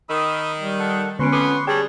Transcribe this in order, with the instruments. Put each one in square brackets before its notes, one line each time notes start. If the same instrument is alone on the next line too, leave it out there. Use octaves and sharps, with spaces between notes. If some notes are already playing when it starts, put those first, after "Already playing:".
[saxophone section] D#3 [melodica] B5 D#6 E6
[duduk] G3
[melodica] A4 F#5
[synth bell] D3 B3 D7 [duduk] C#4 [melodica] B4 C6 C#6
[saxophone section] F2 B3 [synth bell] D6 C7
[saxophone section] G3 [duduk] G#4 [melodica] C#5 A5 [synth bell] G5